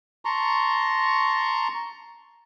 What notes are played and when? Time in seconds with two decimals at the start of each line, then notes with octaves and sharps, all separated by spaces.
0.25 A5 A#5 C6 C#6